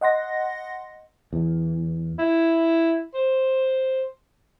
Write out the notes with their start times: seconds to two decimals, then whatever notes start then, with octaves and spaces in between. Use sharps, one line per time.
0.01 D#5 F#5 C6 A#6
1.33 E2
2.19 E4
3.14 C5